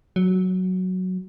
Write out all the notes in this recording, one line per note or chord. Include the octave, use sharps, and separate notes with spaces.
F#3